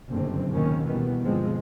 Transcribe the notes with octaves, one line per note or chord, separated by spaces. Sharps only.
F#1 B1 G2 D3 D#3 C4
A#1 D#2 B2 D#3 A#3 C#4
C#2 B2 D#3 E3 G3 B3
G1 B2 F3 G#3 C4